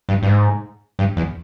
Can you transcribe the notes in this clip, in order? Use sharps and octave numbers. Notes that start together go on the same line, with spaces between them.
G2
G2
G#2
G2
E2